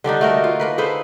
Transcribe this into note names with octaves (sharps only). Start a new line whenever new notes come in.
D3 G3 D4 D#4
A3 F#4 A#4
F4
A#3 A#4 B4
G#4 A4 B4 C5